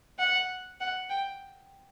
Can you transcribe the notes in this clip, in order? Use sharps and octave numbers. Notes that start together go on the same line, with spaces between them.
F#5
F#5
G5